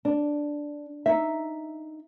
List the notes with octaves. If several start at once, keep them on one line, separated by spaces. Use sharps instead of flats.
D4
D#4 E5